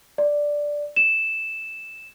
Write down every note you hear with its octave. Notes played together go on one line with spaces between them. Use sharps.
D5
E7